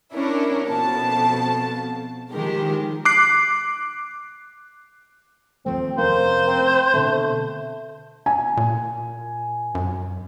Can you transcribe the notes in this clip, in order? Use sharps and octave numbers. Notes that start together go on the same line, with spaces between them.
C#4 D4 E4 A#4
F2 B2 A5
D#3 F3 G#3 G4 A#4
D6 F#6 C7
D#2 F3 A3 C4
F1 A3 A#3 C#4 C5
C4
B2 D3 A3 C4
G#5
A#2
F#2